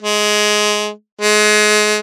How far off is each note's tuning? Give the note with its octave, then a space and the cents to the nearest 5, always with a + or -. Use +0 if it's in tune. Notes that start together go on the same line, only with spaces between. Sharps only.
G#3 +15
G#3 +30